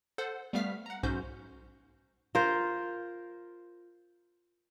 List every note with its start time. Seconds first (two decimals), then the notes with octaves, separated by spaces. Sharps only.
0.18 A4 C5 F#5
0.53 G3 A3 B3 F5 F6 B6
0.86 F#5 A#5
1.03 B1 G#2 C#4 F#4 C5 G6
2.35 F4 A#4 C5